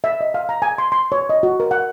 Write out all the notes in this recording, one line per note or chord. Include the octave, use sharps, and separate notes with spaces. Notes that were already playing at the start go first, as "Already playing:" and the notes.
E5
D#5
F5
A#5
G#5
C6
C6
C#5
D#5
F#4
A#4
F#5